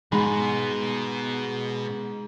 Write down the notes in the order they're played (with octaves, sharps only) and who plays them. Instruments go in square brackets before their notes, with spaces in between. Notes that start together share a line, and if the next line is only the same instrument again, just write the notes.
[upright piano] G#2 B5 [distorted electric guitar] B2 [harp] G#3